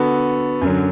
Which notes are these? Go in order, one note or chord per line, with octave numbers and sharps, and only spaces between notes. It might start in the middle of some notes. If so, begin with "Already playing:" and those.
Already playing: D3 B3 F#4 A4
F#2 D3 F#3